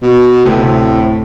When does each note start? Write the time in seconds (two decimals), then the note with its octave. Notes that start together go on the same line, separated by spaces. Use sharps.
0.02 B2
0.45 D2 A2 C3